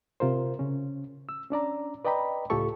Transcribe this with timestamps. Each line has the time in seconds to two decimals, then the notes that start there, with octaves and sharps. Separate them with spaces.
0.20 C3 F4 A#4 C5
0.59 C#3 C#4
1.29 E6
1.50 C#4 D4 D5 A#5
2.05 B4 D5 D#5 G5 A#5 B5
2.50 C#2 A2 F4 G4 A4 C#6